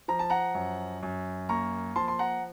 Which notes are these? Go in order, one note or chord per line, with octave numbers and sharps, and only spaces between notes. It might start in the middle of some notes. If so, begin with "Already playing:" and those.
F3 A#5
A5
F#5 A#5
F#2
F#2
A#3 A#5 C#6
F3 A5 C6
C6
F#5 A#5